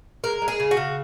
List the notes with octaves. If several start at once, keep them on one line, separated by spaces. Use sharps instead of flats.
G#3 A#4
G#3
G#4
C#3
F#4
C#3